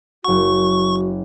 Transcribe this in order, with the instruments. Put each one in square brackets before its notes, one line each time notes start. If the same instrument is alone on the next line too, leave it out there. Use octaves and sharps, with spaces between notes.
[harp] F#1 F#5 [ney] F#4 [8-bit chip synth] C#6